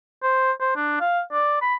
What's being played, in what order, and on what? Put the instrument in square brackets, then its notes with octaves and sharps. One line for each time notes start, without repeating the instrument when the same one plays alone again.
[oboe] C5
C5
D4
F5
D5
B5